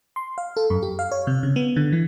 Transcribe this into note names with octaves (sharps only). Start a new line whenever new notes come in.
C6
F5
A4
F#2
G4
F5
C#5
C3
C#3
B3
D3
E3